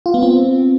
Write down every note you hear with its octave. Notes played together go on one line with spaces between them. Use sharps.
F4
B3
C4